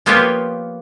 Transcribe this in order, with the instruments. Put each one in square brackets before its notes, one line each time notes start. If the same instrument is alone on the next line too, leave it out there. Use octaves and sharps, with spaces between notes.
[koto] F3 A#3 B3 F4 G4 C#5